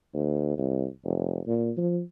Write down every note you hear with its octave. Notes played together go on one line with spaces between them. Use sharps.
D2
C2
F1
A#2
F3